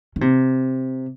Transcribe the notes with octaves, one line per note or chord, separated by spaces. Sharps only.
D#3
C3